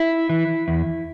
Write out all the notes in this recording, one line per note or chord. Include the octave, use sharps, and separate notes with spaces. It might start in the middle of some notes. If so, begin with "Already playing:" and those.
Already playing: E4
E3
E2